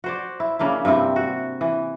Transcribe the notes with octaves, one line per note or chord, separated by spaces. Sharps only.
F#4 C5 D5
E4
C#3 A#3 D4 E4
G2 C3 C4 E4
F#4
E3